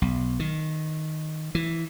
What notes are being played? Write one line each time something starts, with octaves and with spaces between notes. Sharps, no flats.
B1
D#3
E3